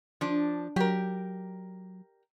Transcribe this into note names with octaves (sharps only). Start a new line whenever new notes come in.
F3 D4
F#3 G4 A#4